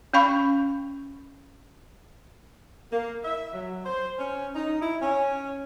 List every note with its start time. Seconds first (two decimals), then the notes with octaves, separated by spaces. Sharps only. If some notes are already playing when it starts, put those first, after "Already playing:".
0.14 C#4 F5 B5 C#6
2.92 A#3
3.25 E5
3.53 F#3
3.85 C5
4.18 C#4
4.56 D#4
4.81 E4
5.02 C#4